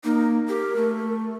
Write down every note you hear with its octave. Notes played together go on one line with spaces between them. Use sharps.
A#3 D#4
G4 A#4
A3